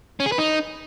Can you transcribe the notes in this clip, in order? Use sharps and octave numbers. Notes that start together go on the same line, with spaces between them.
C#4
G#4
B4
D#4